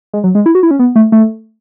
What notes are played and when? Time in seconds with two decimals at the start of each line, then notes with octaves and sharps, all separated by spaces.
0.13 G#3
0.24 F#3
0.35 G#3
0.46 E4
0.55 F#4
0.63 E4
0.71 C#4
0.79 B3
0.96 A3
1.12 A3